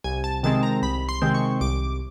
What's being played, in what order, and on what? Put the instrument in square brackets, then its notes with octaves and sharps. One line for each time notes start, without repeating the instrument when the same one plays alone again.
[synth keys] C2 G#5
A5
C3 D#3 G#3 C4 A5
A#5
C2 B5
C6
C3 D#3 G#3 C4
C#6
C2 D6